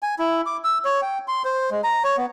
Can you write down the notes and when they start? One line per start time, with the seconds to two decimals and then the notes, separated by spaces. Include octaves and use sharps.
0.03 G#5
0.19 E4
0.46 D6
0.64 E6
0.85 C#5
1.02 G5
1.28 C6
1.45 C5
1.71 G#3
1.84 A#5
2.04 C#5
2.17 B3